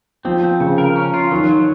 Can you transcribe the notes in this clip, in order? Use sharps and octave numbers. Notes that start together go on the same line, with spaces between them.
F3 C4
C4
C#3
A#4
C#4
F4
D#3 F#3
F#3